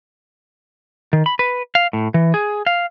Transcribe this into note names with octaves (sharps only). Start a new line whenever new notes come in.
D#3
B5
B4
F5
A2
E3
G#4
F5